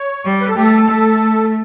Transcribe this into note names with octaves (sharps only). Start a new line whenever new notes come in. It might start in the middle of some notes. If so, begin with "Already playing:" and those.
Already playing: C#5
G3
B4
A4
A3 G4
A4
A3